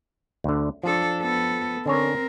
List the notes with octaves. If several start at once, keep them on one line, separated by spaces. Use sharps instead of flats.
D2 D3
F3 D4 A4
B3 A4
D3 C4 C#4 A#4 C#5